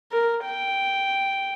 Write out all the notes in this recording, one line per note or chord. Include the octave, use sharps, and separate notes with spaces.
A#4
G5